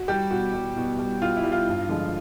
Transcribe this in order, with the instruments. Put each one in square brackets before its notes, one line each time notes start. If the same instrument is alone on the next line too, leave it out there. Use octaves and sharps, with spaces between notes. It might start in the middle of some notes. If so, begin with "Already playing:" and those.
Already playing: [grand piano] F#4
G3 G4
B2 F#4
G3
B2
G3
B2 F4
E4
G3
F4
G2
D3 F3 G#3